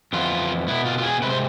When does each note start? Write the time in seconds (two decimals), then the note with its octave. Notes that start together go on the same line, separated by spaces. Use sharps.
0.13 F2 E3 B3 F4
0.68 B2 B3 E4
0.85 F4
0.98 F4
1.04 G#4
1.22 C3 G#3 C4 B4
1.30 C5